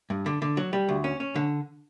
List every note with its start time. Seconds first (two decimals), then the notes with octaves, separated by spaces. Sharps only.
0.10 G2
0.26 D3
0.42 D3
0.57 F#3
0.73 G3
0.89 D2
1.04 C#4
1.20 C#4
1.36 D3